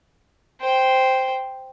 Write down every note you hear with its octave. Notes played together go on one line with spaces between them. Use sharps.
C5 G5